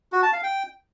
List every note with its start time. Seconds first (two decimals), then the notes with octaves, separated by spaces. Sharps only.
0.13 F#4
0.23 A5
0.33 F5
0.43 G5